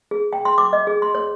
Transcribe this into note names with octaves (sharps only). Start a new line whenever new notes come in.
G#4
G5
C6
D6
D#5
G#4
C6
C#5